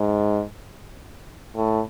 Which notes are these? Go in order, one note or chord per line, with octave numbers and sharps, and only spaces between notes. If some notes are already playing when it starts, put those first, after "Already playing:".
Already playing: G#2
A2